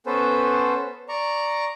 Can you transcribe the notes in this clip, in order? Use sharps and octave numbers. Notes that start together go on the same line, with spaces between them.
B3 C#4 A4 B4 C5
D5 A#5 C#6